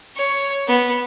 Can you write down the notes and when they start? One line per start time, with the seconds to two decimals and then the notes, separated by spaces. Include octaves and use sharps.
0.17 C#5
0.68 B3